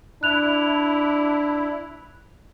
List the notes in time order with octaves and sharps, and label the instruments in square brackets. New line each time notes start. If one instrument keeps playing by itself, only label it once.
[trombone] D4 [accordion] E4 [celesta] F#6 F7